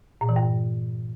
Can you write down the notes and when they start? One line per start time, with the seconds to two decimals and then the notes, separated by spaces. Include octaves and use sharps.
0.21 A#2
0.29 E3
0.36 G2